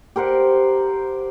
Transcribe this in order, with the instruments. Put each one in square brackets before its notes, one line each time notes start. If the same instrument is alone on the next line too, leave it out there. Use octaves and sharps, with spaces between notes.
[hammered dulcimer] G4 A#4 C5 F#5